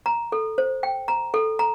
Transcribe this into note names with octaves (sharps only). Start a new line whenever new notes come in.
A#5
A4
C5
G5
A#5
A4
A#5